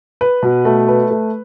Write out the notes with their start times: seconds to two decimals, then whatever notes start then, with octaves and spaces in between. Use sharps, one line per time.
0.21 B4
0.43 B2
0.65 A3
0.88 B4
1.11 A3